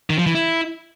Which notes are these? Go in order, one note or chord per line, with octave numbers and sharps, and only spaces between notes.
D#3
F3
E3
E4